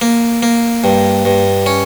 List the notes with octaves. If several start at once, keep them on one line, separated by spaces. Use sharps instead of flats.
A#3
A#3
G2
G2
C#4